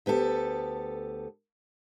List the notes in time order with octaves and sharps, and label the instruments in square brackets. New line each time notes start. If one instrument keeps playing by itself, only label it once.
[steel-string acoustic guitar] D2 B3 G4 A4